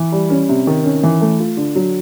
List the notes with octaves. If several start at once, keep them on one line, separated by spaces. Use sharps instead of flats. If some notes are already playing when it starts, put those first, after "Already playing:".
Already playing: E3
G3
C#4
C3
D#3
C#4
E3
A3
F4
D3
F#3